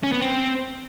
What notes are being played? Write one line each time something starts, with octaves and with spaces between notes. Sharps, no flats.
C#4
B3
C4